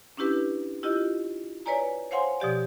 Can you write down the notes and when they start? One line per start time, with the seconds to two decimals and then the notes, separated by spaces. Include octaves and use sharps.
0.17 C#4 D4 E4 G4 B4
0.83 E4 F4 G4 D#5
1.66 B4 C#5 D5 G#5 A#5
2.11 C5 C#5 F5 F#5 G#5 C6
2.40 B2 F3 G4 D5